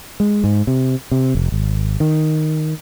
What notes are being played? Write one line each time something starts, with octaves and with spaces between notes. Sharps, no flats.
G#3
G#2
C3
C3
F1
G#1
D#3